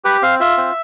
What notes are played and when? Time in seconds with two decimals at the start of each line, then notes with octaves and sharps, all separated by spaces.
0.04 G4 B4
0.22 C4 F5
0.40 F4 E5
0.57 C4